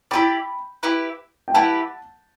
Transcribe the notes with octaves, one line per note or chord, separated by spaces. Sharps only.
E4 G4 B4 D5 G5 B5
E4 G4 B4
G5
E4 G4 B4 F#5 A5